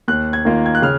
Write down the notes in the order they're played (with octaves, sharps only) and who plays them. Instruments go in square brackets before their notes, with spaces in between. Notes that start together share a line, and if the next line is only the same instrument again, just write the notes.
[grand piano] D#2 F#6
G#6
D#3 A#3 F4
G#6
F#6
C#3 F6